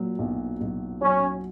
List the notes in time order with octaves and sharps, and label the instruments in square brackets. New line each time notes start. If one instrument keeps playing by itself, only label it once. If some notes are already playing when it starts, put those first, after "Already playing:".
Already playing: [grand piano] A#2 F#3
B1
B1
[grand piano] F#3 [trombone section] C#4